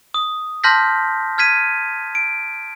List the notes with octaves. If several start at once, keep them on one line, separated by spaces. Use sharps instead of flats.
D#6
A5 C6 F6 G6 A#6 B6
F6 G#6 B6 D#7
D7